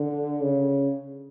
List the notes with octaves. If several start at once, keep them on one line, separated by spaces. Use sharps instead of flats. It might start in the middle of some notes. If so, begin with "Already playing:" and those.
Already playing: D3
C#3